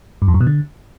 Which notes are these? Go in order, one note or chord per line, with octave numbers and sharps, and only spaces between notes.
G2
F2
F#2
B2
D3